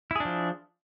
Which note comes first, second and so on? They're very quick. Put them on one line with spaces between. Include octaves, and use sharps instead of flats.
E4 G#4 D4 F3